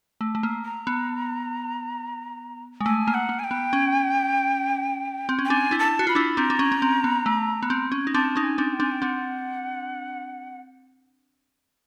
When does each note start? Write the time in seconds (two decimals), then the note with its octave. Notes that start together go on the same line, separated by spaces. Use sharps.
0.21 A3
0.35 A3
0.43 A#3
0.65 A#5
0.87 B3
2.81 G#3
2.86 A3 G#5
3.07 A#3
3.14 F#5
3.29 A#3
3.39 G#5
3.44 G5
3.51 B3
3.73 C#4
5.29 C4
5.39 C#4
5.45 G5
5.49 C4 D4 G#5
5.71 D4 E4
5.79 A5
5.99 F#4
6.07 F4 B5
6.15 D4 E4
6.37 C4 D4 A#5
6.50 D4
6.59 C#4
6.72 C#4
6.82 C4
7.04 B3
7.26 A3
7.63 B3
7.70 C4
7.92 C#4
8.07 D#4
8.14 C4 D4 A5
8.36 C#4 D#4
8.43 G#5
8.58 C4 D4
8.73 G5
8.80 C4 D4 G#5
8.91 G5
9.02 C4 D4 F#5